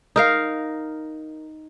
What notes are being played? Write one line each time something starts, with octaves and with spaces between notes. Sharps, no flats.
D#4 A#4 F5